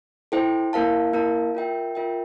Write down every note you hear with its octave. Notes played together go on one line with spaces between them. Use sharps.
E4 A4 C5 G5
A#3 E4 A#4 F5 A5
A#3 E4 A#4 F5 A5
F4 A#4 E5 G5
F4 A#4 E5 G5